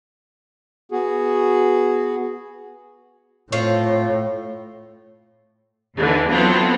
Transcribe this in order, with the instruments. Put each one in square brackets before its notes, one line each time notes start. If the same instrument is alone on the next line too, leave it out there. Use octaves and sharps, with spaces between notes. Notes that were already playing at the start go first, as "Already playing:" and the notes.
[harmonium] B3 F#4 G#4
[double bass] A2 [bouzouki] C4 F4 C#5
[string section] D#2 D3 E3
F#3 B3 C4 E4 F4 A4